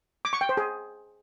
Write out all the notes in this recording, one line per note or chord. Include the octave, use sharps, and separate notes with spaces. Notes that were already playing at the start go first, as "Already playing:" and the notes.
D6
C#6
G5
C5
G#4